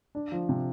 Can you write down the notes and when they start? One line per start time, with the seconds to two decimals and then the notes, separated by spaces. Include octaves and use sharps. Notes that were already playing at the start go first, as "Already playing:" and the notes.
0.15 D4
0.32 F3
0.49 C3